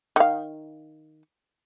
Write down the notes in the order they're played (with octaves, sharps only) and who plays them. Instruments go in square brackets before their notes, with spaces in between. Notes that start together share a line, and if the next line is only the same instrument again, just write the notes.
[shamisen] D#3 F5